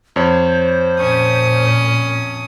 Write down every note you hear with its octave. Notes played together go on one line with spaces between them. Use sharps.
F2 C5 C#5
A#2 C#4 D#6